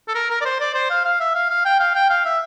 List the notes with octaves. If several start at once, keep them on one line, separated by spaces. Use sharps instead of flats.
A4
A#4
A#4
D5
C5
D5
C5
F5
F5
E5
F5
F5
G5
F5
G5
F5
E5